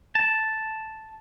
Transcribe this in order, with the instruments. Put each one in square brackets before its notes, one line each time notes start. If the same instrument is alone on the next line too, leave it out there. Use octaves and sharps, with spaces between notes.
[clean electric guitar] A5